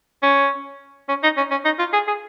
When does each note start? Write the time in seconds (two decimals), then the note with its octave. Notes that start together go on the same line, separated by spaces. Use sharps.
0.22 C#4
1.09 C#4
1.23 D#4
1.37 C#4
1.51 C#4
1.65 D#4
1.79 F4
1.93 G#4
2.08 G#4